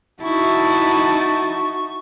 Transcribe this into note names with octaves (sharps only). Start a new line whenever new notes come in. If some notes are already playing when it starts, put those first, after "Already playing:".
D#4 E4 F#4 A5 C#6